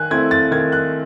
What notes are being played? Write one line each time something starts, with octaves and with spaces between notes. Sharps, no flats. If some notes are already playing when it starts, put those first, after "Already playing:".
Already playing: D#3 G#5 F#6
A3 C4 E4 G#6
A6
D#3 G#6
F#6